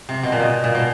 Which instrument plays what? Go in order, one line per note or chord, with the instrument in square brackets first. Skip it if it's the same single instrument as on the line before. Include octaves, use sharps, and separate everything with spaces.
[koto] C3
B2
A#2
B2
A#2
B2